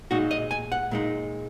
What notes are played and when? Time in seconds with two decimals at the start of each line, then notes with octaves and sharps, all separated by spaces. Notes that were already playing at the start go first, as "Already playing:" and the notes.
0.11 A#2 G#3 D#4 F#4
0.31 D#5
0.51 G#5
0.72 F#5
0.91 A#2 G#3 D#4